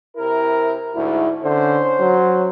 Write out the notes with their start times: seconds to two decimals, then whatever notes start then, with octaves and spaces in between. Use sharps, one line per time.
0.17 C3 E4 A#4
0.95 D2 G#2 E4
1.43 D3 C#4 C5
2.00 F#3